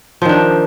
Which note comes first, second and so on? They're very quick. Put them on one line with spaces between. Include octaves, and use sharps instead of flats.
F3 D#3 D4